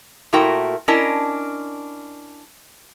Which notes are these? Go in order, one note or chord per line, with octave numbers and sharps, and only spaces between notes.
A#2 A3 E4 F#4 A#4 G5
C#4 D4 E4 A#4 D#5 A5